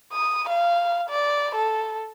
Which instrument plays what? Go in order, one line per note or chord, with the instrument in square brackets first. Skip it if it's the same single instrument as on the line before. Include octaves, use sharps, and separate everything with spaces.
[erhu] D#6
F5
D5
A4